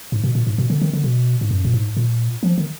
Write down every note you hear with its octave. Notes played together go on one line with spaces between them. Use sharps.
G#2
B2
A#2
G#2
B2
D3
D#3
D3
B2
G#2
F#2
A#2
G#2
A#2
F3
D#3